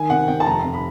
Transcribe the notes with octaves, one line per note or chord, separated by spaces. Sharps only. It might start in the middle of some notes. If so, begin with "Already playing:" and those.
Already playing: D#3 G#5
C3 F#5
C3 G5
A5
F1 A#5
C3
B5